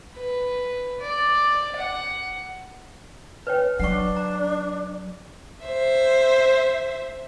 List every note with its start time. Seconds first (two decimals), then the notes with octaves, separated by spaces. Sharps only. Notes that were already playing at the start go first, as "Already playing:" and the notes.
0.15 B4
1.00 D5
1.76 F#5
3.47 B4 C#5 G5
3.80 F#3 D4 F#5 C#6
4.16 A#5
5.66 C5 E5